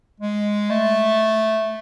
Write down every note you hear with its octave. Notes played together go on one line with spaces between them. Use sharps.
G#3
A3